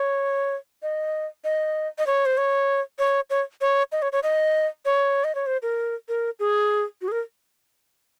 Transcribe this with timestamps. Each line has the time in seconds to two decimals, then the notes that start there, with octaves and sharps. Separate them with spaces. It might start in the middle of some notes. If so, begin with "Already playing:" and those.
Already playing: C#5
0.83 D#5
1.44 D#5
1.98 D#5
2.07 C#5
2.26 C5
2.37 C#5
2.99 C#5
3.30 C#5
3.61 C#5
3.92 D#5
4.02 C#5
4.12 C#5
4.23 D#5
4.85 C#5
5.24 D#5
5.35 C#5
5.47 C5
5.62 A#4
6.09 A#4
6.40 G#4
7.02 F#4
7.08 G#4
7.12 A#4